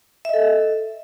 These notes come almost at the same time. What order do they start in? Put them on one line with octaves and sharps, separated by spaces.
E5 D#5 A4